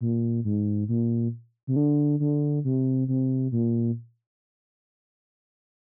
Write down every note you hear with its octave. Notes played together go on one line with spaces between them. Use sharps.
A#2
G#2
A#2
C3
D3
D3
C3
C3
A#2